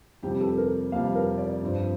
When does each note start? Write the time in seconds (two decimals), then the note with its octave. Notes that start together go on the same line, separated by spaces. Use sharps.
0.23 F2 C3 G3 G4
0.41 A4
0.57 A#4
0.92 F2 C3 G3 F5
1.15 A#4
1.38 D5
1.61 G2 F3 C4